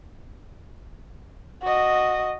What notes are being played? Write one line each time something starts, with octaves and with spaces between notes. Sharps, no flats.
F#4 D#5